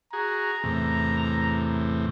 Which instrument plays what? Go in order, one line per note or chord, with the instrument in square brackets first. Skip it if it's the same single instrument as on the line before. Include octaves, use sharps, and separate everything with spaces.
[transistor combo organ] F#4 G#4 [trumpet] A#5
[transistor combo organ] E2 A2 C3